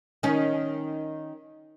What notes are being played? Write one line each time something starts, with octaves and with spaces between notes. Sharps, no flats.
D#3 C#4